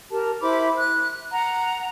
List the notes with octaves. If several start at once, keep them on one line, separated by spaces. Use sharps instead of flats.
G4 A#4 A5
E4 C5 B5 D6
F#6
F#5 A#5